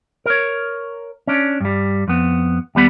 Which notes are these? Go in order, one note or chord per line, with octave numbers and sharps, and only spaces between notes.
A#4 C#5
C#4 D4
G2 G3
F2 B3
D#2 G3 B3 B5